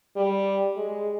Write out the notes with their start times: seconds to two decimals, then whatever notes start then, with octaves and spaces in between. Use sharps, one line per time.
0.16 G3
0.76 G#3